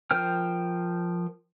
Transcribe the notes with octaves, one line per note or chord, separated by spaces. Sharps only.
F3 A#4 C5 G5 F6